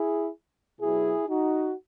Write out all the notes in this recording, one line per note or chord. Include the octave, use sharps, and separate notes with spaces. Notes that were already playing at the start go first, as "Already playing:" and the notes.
Already playing: E4 G#4
B2 F#3 E4 G#4
D#4 F#4